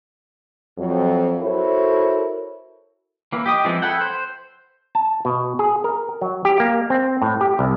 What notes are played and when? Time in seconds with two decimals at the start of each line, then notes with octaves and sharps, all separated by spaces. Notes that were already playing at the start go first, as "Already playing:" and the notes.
0.78 F2 F#3
1.41 E4 F#4 A4 A#4 C5 C#5
3.32 E3 A#3
3.46 G4 D#5 D#6
3.65 E3 F3 G#3 C4
3.82 E4 A4 F#5 G5
4.01 C5
4.95 A5
5.25 B2
5.59 G#4
5.84 A#4
6.21 F#3
6.45 G4
6.60 A#3
6.90 C4
7.22 A2
7.41 G4
7.59 C2